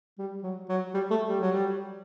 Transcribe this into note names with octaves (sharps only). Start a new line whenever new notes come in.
G3
F#3
F#3
G3
A3
G3
F#3
G3